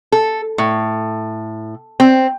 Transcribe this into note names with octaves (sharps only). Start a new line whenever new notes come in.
A4
A2
C4